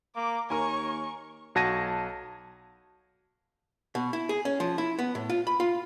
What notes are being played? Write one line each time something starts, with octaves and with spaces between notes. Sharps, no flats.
A#3 D6
D#2 A#4 C#5 G#5 C#6
B1 F#4 A5 G#6 A#6 D#7
B2
E4
G#4
C#4
F3
E4
B3
A2
F4
B5
F4